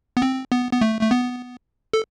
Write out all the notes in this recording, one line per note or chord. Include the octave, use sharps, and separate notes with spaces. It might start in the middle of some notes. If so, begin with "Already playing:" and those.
B3
C4
B3
B3
A3
A3
B3
A4